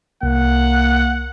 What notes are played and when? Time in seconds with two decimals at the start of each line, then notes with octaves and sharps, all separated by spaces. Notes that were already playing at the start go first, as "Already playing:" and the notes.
0.23 C2 A#3 F#5